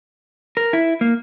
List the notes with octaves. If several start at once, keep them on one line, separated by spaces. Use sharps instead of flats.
A#4
E4
A#3